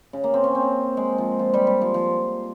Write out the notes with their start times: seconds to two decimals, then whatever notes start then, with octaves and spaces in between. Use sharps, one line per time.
0.13 C#3
0.24 A#3
0.34 C4
0.44 C#4
0.55 C4
0.97 G#3
1.18 F3
1.39 F3
1.54 G3
1.67 G3
1.82 F3
1.94 F3